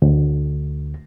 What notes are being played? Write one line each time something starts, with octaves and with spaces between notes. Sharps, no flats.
D2